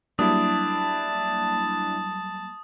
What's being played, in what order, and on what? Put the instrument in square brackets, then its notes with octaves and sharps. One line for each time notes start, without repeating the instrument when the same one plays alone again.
[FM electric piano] F#3 G3 A#3 [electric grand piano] D4 E4 [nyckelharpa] A5 [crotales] D#6